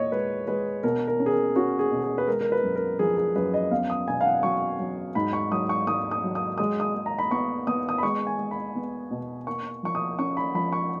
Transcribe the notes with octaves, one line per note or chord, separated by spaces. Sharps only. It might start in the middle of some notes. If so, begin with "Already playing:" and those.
Already playing: A#2 C#5 D#5
G#3 B4
G#3 B4
B2 A#4
A#4
C#4
G#4
A#4
C#4 F#4
G#4
B2
G#4
B4
G#3 A#4
A#4
B4
F#2
A#4
F3 G#4
G#4
F#2 B4
D#5
B3 F5
D#6
B2 G#5
F5
F#5
F#3 C#6
F#3
G#2 B5
C#6
F#3 D#6
C#6
G#2 D#6
D#6
F#3
D#6
G#3 D#6
D#6
G#3
A#5
B5
B3 C#6
B3 D#6
D#6
B5
G#3 C#6
G#5
G#3
B5
B3
B2
A#3 C#6
F3 C#6
D#6
C#4 C#6
B5
F3 B5
C#6